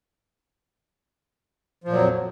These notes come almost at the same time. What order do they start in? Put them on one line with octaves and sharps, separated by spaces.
F3 A#2 F#3 F2